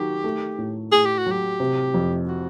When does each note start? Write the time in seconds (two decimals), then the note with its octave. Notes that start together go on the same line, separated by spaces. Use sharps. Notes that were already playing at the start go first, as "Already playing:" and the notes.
Already playing: D#3 F#3 G4
0.24 A3
0.58 A2
0.92 A2 G#4
1.05 G4
1.18 F#4
1.26 F#3
1.32 G4
1.60 C3
1.94 F2
2.28 F#4